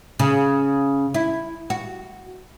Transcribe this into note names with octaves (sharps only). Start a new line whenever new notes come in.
C#3
E4
F#4